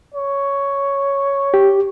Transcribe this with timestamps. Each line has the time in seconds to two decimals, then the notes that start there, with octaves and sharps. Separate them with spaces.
0.15 C#5
1.54 G4